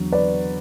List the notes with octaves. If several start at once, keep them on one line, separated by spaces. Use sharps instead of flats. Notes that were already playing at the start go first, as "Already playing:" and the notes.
Already playing: E2 D3 F#3
B4 D5